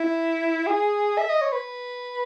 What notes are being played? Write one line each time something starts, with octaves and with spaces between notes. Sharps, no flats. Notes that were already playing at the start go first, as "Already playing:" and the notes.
Already playing: E4
G#4
E5
D#5
C#5
B4